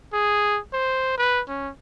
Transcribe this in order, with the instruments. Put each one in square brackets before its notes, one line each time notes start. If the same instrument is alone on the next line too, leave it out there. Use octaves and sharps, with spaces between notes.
[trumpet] G#4
C5
B4
C#4